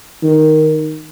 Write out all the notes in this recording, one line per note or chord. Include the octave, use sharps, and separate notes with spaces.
D#3